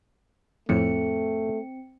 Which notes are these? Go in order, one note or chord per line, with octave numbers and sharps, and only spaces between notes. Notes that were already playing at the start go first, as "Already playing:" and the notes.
F2 A2 A3 C4 C#7